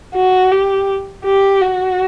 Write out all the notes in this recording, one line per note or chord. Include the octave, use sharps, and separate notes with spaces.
F#4
G4
G4
F#4